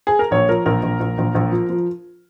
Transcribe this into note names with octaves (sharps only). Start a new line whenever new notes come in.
G#4
A#4
A#1 C#5
F3 A#4
A#1 A#4
A#1
A#1
A#1
A#1
F3
F3